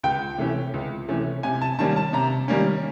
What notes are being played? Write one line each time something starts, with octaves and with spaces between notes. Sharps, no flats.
C#2 G5
C3 E3 A3 C#4
C#2
C3 E3 A3 C#4
C3 G#5
A5
D#3 G3 A#3 C#4 A5
A5
C3 A#5
D#3 G3 A#3 C#4